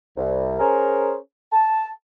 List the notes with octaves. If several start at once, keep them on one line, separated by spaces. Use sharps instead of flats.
C2
C#4 G#4 A#4 C5
A5